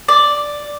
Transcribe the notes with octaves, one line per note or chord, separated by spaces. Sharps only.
D5